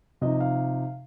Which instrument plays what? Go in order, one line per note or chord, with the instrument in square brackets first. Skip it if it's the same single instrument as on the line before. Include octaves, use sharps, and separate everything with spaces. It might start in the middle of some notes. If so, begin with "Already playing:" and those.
[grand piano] C3 F3 D#4 D#5
F5